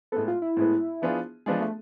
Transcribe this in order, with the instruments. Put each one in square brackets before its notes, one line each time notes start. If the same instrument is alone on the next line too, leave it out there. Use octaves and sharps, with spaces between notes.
[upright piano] A2 G#3 B3 [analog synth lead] A4
[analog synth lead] F4
E4
[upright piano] A2 G#3 B3
F3 B3 D4 F4 G#4
[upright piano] F3 B3 D4 F4 G#4 [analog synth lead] G#3
[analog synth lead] A3